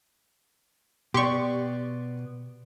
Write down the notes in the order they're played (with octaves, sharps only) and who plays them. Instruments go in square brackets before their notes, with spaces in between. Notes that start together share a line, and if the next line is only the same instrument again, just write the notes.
[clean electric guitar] B2 B3 [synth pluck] G4 C#6 [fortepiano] D5 C6